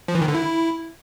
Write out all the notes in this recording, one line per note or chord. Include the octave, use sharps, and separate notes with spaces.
F3
E3
D#3
D3
E4